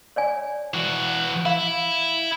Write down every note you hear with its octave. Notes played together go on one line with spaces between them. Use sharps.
C#5 D5 G#5
E3 F#4
E4 F5